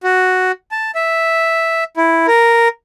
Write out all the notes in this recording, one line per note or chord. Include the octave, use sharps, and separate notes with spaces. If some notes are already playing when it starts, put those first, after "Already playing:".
F#4
A5
E5
E4
A#4